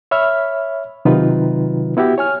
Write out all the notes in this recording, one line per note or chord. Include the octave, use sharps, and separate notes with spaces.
C#5 E5 B5 F6
C3 D#3 F#3 D#4 F4 B4
B3 E4 F#4 G4
C#5 G#5 F6